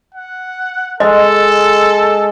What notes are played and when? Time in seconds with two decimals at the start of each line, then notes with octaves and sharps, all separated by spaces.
0.14 F#5
1.00 G#3 A4 D#5